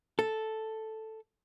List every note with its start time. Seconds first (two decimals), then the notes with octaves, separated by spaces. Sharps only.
0.19 A4